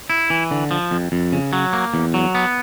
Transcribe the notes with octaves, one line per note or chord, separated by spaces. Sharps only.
E4
E3
D3
F3
F2
F2
C#3
F#3
A#3
E2
F#3
B3